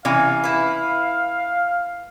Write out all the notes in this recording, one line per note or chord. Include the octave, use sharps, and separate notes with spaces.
C3 E3 C#4 F5
E4 B4